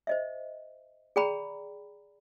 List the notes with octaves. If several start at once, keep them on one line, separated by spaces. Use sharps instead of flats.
C5 D#5 E5
G#4 D5 G5 A#5 B5